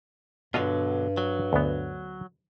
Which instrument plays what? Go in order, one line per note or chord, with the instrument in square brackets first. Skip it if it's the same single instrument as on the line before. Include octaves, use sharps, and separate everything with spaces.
[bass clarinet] G2 [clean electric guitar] B2 D3 F#3 [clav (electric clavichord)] F4 D#5 F5
[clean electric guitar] F#3
[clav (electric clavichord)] D2 B3